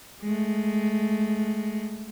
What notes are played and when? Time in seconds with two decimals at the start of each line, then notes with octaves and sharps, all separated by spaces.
0.22 G#3 A3